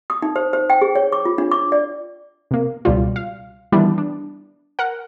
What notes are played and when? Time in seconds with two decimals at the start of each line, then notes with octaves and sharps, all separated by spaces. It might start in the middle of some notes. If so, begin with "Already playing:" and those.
0.10 D#6
0.22 D#4
0.36 C5
0.53 C5
0.70 G5
0.81 G#4
0.95 C#5
1.12 D6
1.25 F4
1.38 D4
1.51 D6
1.72 D5
2.51 C3 A#3
2.85 C#2 B2 G3 F4
3.16 F5
3.72 D#3 E3 G3 B3 D4 E4
3.98 D4
4.79 A#4 F#5